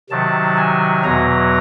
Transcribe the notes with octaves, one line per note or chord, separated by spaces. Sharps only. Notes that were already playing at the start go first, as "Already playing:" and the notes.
C3 D#3 F#3 A5
G#5
E2 B2 F#3 A#5